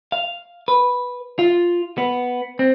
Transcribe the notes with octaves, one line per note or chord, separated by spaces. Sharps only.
F5
B4
F4
B3
C4